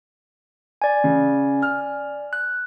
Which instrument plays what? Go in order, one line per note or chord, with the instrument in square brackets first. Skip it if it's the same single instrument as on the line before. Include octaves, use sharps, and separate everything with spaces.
[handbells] D5 G#5
[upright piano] C#3
F6
[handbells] F#6